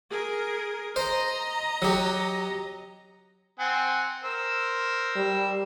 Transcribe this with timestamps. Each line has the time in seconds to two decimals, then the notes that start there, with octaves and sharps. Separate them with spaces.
0.11 G#4 A#4
0.96 C5 D#5 A#5
1.82 F#3 G4
3.60 C4 F#5 G#5
4.24 A#4 C5 E6
5.16 G3